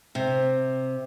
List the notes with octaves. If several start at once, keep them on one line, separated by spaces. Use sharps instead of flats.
C3